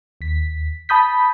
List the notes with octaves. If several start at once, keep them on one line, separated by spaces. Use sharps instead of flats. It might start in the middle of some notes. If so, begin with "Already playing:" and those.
D#2 B6
A5 B5 D#6 G6 B6